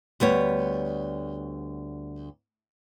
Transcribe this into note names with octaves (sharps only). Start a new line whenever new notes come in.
D2 G3 B3 C#5